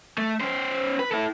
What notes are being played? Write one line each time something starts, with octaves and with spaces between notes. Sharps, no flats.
A3
C#4 C5
B4
E4 A4